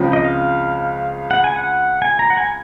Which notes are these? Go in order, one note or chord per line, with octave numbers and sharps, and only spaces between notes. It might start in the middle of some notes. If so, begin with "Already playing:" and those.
Already playing: C#2 C#3 F3 C4
D#5
F5
F#5
G#5
F#5
G#5
A#5
F#5
G#5